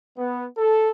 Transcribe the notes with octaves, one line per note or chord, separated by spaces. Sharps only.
B3
A4